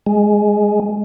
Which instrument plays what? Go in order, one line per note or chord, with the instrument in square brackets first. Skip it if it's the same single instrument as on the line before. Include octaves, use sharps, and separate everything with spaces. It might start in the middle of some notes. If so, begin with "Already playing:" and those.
[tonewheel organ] G#3